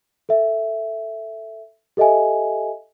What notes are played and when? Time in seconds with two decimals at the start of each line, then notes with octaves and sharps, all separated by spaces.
0.29 A4 E5
1.97 G4 A4 D#5 E5 G#5